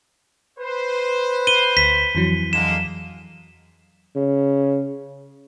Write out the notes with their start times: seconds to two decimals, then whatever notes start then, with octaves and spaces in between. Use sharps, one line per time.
0.59 B4 C5
1.47 D#7 G7
1.77 D2 B6
2.15 F2 E3 F#3
2.53 D3 G#3 A#3 E7
4.16 C#3